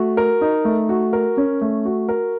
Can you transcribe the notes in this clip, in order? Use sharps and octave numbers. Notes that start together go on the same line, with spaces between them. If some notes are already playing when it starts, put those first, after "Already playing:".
Already playing: A3 F#4
A#4
D#4
A3
F#4
A#4
C#4
A3
F#4
A#4